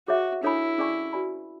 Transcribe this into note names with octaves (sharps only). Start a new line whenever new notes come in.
F#4 G#4 C#5 E5
D4 E4 A4 C#5 G#5 B5
C#4 G#4 D5 G#5 C#6
F#4 B4 D5 G#5 B5